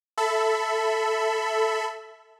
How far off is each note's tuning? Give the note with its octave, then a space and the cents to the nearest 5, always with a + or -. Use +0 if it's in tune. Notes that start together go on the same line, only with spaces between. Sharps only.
A4 +0 E5 +0 B5 +20